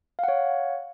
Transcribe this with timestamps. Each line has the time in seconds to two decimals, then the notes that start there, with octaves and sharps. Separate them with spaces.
0.19 F5
0.24 F#5
0.28 C#5